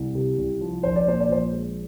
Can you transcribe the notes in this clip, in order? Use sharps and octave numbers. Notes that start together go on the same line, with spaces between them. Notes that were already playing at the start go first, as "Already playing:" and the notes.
Already playing: C2
C3
C2
F3
A#1 C5
D5
A#2 C5
D5
A#1 C5
G#3